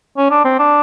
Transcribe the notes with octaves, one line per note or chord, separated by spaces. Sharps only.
C#4
D4
C4
D4